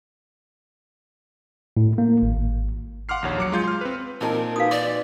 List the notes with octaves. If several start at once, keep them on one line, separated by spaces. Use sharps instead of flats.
A2
A#3
G#1
F5 F#5 C6 D6 F6 C7
A#1 D#2 C#5
F#3 D6 C#7
G#3 F4 G6
C6 F6
C4 B4
A#2 C4 D#4 E4 A#4 D#5 A5
D#4 F#4 B4 F5 D#6
D5 D6